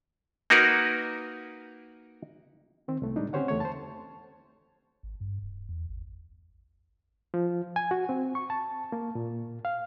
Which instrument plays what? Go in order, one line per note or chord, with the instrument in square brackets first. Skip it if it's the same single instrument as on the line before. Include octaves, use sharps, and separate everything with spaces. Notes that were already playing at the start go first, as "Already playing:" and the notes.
[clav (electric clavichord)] A#3 D#4 F#4 A#4 B4
[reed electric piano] D#3 C4
C2 A3
A2 G3 G#3 D4 D#4
C4 C#4 G4 C5 C#5 F#5
E2 A3 C#5
C5 A5
[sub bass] G#1
G2
D1
E2
G#1
[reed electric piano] F3
G#5
F#4
C4
C#6
A5
A#3
A#2
F5